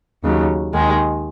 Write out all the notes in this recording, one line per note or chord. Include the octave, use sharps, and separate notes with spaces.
D#2 C#3 F#3
D#2 D#3 G#3